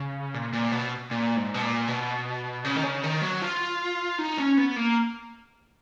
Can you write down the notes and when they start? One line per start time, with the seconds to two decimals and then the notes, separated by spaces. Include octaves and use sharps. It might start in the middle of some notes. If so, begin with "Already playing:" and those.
Already playing: C#3
0.34 A#2
0.53 A#2
0.72 B2
1.11 A#2
1.37 G#2
1.54 B2
1.62 A#2
1.88 B2
2.65 C#3
2.76 D#3
2.83 C#3
3.03 D#3
3.22 F#3
3.42 F4
4.19 D#4
4.38 C#4
4.57 B3
4.76 A#3